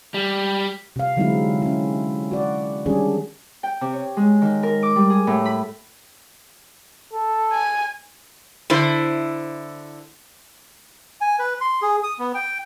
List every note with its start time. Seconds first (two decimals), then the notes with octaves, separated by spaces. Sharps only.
0.14 G3
0.96 C3 F5
1.17 D3 F#3 G#3 C4 D#4 E4
1.62 C#4 E4
2.31 F#4 D5
2.86 D#3 G3 C#4 D4 G4 G#4
3.63 G5
3.81 C3
3.93 C#5
4.17 G#3
4.42 D#3
4.63 A#4
4.82 D6
4.96 G3
5.10 G#4
5.27 A2
5.46 B5
7.13 A4
7.52 G#5
8.70 D3 E4 C5
11.21 G#5
11.39 B4
11.61 C6
11.82 G#4
12.04 D#6
12.19 B3
12.34 G5